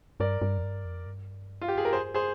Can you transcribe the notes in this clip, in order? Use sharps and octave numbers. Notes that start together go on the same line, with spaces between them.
G2 A#4 D5
G2
F2
G2
F2
G2
F4
G4
G#4
A#4
G#4 C5
G#4 C5